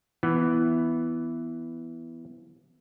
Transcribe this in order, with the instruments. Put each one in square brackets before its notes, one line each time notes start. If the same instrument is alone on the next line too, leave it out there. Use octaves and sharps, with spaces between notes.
[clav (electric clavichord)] E3 B3